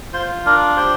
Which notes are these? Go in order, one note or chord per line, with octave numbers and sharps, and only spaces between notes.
F4 C5
D4 A#4
G4 C5